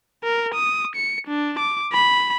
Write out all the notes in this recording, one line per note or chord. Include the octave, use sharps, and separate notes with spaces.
A#4
D#6
C#7
D4
D6
B5